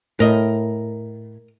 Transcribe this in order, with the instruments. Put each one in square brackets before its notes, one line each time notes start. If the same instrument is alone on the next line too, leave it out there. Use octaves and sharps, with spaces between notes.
[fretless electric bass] A2 [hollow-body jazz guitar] A#4 D#5